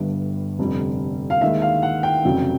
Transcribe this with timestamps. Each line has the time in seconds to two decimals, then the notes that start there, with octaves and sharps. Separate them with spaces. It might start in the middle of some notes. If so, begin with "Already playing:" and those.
Already playing: G1 G2 D3 G3
0.59 F1 F2 D3 G3
1.30 F5
1.41 D#2 D#3 G#3 E5
1.62 F5
1.82 F#5
2.03 G5
2.24 F1 F2 C#3 F#3